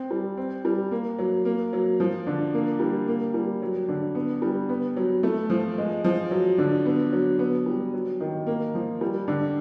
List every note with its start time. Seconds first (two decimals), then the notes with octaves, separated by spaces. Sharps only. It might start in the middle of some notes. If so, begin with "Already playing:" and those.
Already playing: C4
0.11 G3
0.37 C4
0.65 G3
0.91 A#3
1.18 F#3
1.45 A#3
1.73 F#3
2.00 F3
2.27 D3
2.54 A#3
2.80 G3
3.08 A#3
3.34 G3
3.62 F#3
3.88 D3
4.15 B3
4.42 G3
4.69 B3
4.96 F#3
5.23 A3
5.50 F3
5.78 G#3
6.04 F3
6.31 F#3
6.58 D3
6.85 B3
7.12 F#3
7.39 B3
7.66 G3
7.94 F#3
8.20 D#3
8.47 A#3
8.75 F3
9.01 G3
9.28 D3